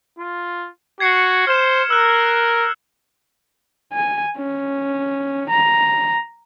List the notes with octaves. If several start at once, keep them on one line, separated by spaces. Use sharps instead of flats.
F4
F#4 G#6 C7 C#7
C5 F6 E7
A#4 E6 F#6
G#5
C#4
A#5